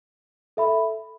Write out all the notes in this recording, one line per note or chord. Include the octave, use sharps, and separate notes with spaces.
A4 E5 B5